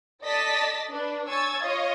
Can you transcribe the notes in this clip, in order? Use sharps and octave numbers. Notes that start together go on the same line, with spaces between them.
A4 D5 D#5 A5 A6 B6
D4 B4
C#5 G#5 C#6 E6 G#6 A6
F4 C#5 D#5 F5